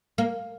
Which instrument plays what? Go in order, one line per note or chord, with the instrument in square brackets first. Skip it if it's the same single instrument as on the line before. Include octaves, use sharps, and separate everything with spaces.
[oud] A#3